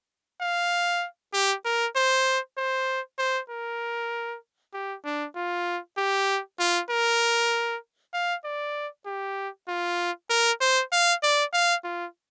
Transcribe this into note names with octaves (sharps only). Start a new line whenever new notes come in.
F5
G4
A#4
C5
C5
C5
A#4
G4
D4
F4
G4
F4
A#4
F5
D5
G4
F4
A#4
C5
F5
D5
F5
F4